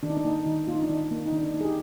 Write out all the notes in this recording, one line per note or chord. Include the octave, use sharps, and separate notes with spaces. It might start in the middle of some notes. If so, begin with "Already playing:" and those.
D#3 D4
D#4
D4
A#3 D#4
D#3 D#4
A#3 F4
D#4
D4
D#3 D#4
A#3
D#4
D#3 D4
D4
A#3 D#4
G#4
D#4 G4